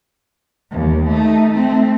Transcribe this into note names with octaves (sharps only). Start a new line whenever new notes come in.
D#2
A3 D#4
A3 C4